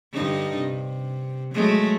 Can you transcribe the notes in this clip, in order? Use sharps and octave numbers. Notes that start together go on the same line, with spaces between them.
G2 D3 D#4
C3
F#3 G#3 A3